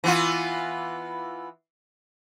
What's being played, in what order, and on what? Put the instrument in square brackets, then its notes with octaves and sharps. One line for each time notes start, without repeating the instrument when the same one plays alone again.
[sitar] E3 B3 F4